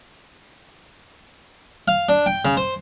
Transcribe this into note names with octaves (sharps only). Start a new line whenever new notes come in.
F5
D4
G5
C#3
C5